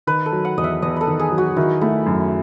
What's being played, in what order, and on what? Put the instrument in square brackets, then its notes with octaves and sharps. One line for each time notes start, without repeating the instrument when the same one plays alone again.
[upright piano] D#3 [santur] B4
[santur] A4
[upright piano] F#3
[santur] F#5
[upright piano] E2 [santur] D#5
[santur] E5
[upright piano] E2 [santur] D#5
[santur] A4 B4
[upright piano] D#3
[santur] G#4
[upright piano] F#3
[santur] F#4
[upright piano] D#3 [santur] E4
[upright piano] A3 [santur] E4
[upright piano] F#2